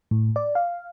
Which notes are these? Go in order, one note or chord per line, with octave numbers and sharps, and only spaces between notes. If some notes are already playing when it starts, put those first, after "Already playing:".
A2
D5
F5